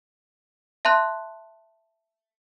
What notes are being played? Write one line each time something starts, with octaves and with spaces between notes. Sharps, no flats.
E5 A5 C6 F#6